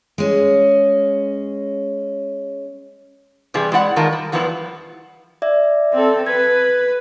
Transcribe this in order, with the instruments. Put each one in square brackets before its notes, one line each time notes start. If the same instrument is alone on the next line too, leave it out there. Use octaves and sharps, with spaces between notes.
[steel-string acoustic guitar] G#3 C#4
[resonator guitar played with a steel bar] C3 E3 G3 G#4
G#3 E4 D5 F#5
D#3 G#3 F4 A#4 A5
G3
E2 F3 G3 B3 D4 E4
[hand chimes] D5 E5
[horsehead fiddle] C4 A4
[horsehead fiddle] B4 [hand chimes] G#6